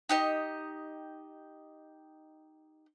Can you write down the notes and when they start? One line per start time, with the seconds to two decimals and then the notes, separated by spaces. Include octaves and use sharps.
0.09 D#4 G4 D#5